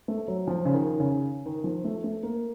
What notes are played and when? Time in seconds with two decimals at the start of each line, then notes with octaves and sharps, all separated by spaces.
0.08 A3
0.28 F#3
0.47 F3
0.65 C#3
0.74 D#3
1.00 C#3
1.46 D#3
1.64 F3
1.84 A3
2.04 A3
2.23 A#3